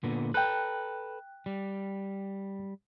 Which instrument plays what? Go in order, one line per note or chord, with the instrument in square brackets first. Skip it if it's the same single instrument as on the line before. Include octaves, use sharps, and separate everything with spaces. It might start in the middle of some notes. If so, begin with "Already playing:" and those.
[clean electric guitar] A#2 D3 B3
[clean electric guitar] A4 B4 [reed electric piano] G5 F#6
[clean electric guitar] G3